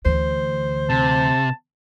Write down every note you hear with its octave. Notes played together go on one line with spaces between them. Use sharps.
D2 E3 C5
C3 A5